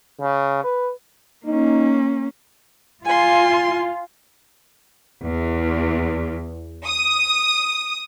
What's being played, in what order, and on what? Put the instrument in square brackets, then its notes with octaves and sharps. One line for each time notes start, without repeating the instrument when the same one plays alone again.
[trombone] C#3
B4
[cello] A#3 C#4 [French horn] D#4
[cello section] F4 [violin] G#5 C6
[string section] E2
D#6